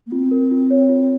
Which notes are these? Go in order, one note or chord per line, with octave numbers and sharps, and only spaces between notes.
A#3
C4 F4
A#4
F4
C#5
F4